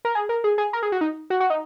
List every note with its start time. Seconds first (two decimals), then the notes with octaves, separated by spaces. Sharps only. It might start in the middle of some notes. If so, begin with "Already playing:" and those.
0.05 A#4
0.15 G#4
0.29 A#4
0.44 G#4
0.58 G#4
0.73 A#4
0.83 G#4
0.92 F#4
1.01 D#4
1.30 F#4
1.40 F#4
1.50 D#4